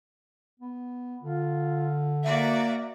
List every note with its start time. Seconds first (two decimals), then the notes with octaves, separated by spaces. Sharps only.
0.60 B3
1.22 D3 F4
2.24 A#3 F#4 D5 E5 A#5